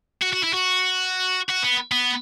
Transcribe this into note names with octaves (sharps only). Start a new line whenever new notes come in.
F#4
F#4
E4
F#4
F#4
B3
B3